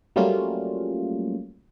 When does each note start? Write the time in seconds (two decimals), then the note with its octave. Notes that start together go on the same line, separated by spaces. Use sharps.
0.16 F#3 G3 A3 A#3 C#4 F4